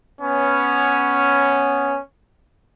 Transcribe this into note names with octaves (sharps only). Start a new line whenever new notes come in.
B3 C#4